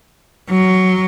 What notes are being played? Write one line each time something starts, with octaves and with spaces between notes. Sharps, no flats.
F#3